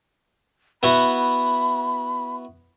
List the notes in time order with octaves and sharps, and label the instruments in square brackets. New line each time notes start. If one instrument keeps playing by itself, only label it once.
[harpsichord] B3 E4 F#4 [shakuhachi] B5